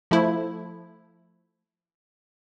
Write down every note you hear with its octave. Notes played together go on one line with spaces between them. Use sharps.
F3 A3 E4